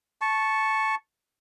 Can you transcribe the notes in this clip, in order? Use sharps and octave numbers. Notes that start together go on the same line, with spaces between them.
A5 C#6